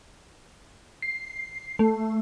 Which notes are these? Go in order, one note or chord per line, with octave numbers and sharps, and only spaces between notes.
C7
A3